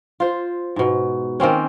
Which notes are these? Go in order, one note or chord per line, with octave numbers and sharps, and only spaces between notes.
F4 C5
G#2 B2
D#3 A#3 C4 C#4